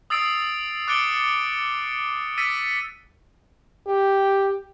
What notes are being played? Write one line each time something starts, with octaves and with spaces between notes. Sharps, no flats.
D#6 E6 A6 C7 D7
D6 F#6 A6 C#7 D7 G7
E6 A6 B6 C#7 D#7
G4